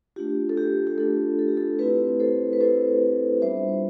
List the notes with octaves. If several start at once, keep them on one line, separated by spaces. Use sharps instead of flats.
A3 D4 F4 G4
A4
G4
G4
A3 D4 F4 A4
A4
G4
A4
A3 C4 E4 G4 B4
A4 C5
B4
A3 C4 E4 A4 C5
G3 B3 D4 F4 C5 E5